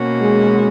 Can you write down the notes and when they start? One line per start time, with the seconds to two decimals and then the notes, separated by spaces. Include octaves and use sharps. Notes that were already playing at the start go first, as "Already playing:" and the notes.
Already playing: B2 A#3 C#4 F#4
0.21 G#3